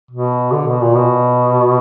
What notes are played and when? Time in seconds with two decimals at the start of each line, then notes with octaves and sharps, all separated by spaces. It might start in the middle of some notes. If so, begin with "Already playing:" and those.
0.11 B2
0.52 D3
0.67 B2
0.81 A#2
0.95 B2